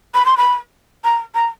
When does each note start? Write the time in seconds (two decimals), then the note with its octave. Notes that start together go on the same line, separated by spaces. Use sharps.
0.14 B5
0.26 C6
0.37 B5
1.04 A#5
1.35 A#5